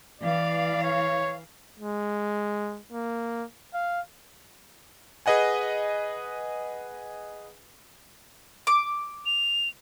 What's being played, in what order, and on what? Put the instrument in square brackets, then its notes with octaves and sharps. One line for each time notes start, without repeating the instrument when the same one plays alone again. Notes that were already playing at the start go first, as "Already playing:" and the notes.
[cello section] E3 F5 [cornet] D5
[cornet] C#5
G#3
A#3
F5
[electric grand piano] G#4 B4 D#5 F#5 G#5
[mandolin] D6
[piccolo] F7